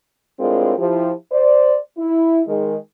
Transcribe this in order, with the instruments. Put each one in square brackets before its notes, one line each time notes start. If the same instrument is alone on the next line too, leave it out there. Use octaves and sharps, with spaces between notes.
[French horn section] A2 G#3 C4 D4 F4 A#4
F3 E4 G4
C5 D5
E4
D#3 G#3